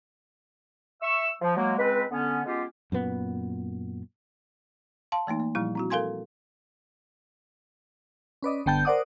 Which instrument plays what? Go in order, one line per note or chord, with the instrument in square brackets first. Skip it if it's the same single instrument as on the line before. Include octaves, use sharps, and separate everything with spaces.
[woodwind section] E5 C#6 E6
F3
F#3 G#3 A#3
C#2 G#3 C4 B4
D3 B3 C#4
G#3 B3 C#4 F4 G4
[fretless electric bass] F#2 A#2 B3
[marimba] F5 A5 C6
E3 A3 A#3 D#4
A#3
A#2 F3 G3 E4
C4 E4 F#4
A4 A#4 F5 G#5 C6 G#6
[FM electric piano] C#4 B4 D5 D#5
G1 D3 B3 G5 A5 G6
A#4 C5 D5 F#5 D6 D#6